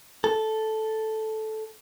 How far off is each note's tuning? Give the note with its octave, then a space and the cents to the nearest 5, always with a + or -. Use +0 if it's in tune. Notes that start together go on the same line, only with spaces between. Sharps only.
A4 -5